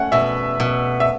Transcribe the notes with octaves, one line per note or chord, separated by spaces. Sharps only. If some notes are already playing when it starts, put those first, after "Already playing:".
Already playing: A3 C#4 F#5
B2 E5
B2
E5